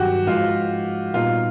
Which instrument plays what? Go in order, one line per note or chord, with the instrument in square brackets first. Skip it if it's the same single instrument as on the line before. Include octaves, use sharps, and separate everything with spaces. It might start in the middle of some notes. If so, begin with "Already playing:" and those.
Already playing: [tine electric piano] G2 D#3 F#3 [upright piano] F#4 G4
[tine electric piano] G#2 F3 G#3 [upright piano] F4
[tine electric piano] A#2 G3 B3 D#4 [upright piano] F4